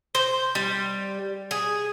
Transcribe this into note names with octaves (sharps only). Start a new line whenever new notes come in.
C5
G3
G#4